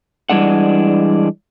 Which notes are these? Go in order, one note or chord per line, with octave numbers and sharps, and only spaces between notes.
E3 G3 G#3 D4 F#5